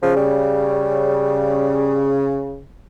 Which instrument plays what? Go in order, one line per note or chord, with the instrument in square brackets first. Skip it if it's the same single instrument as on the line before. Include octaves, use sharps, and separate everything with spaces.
[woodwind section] C#3 [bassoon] F3
[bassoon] G3